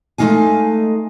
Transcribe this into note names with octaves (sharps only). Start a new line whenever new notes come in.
G#3 A3 B3 D#4 F5 G#5